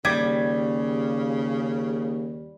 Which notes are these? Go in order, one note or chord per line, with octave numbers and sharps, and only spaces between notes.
D#2 C#3 G3 D6 G#6 B6